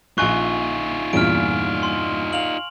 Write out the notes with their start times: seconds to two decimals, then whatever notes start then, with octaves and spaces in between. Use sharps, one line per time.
0.18 A#1 D#4 F4 G#5 C#6 F#6
1.13 E2 G2 A#2 F6 D7
1.83 C6
2.33 F5 F7 F#7